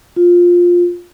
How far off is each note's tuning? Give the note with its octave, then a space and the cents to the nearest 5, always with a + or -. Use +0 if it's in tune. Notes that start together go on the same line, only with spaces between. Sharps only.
F4 +10